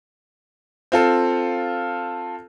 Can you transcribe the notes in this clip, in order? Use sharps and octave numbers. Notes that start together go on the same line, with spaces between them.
C4 F4 A4